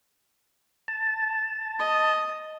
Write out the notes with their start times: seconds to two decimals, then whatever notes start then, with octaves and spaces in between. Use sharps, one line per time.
0.88 A5
1.79 D#5